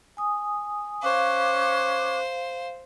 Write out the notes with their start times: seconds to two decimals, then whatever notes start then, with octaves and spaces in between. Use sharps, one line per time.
0.17 G#5 D#6
1.03 C#4 C5 F5 D6 F#6